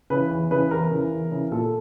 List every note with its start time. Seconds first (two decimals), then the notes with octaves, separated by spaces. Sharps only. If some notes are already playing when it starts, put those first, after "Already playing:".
0.10 C#3 E3 B4
0.30 E2
0.51 C#3 E3 B4
0.71 E2 A#4
0.91 C#3 E3
1.11 E2
1.32 C#3 E3
1.51 A#2 A4